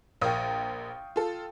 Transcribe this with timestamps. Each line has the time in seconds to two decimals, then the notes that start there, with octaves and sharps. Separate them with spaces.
0.21 A#1 A#4 F5 G5 C#6 D#6
1.16 F4 A4